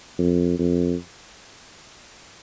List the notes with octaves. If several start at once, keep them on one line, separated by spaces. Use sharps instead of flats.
F2
F2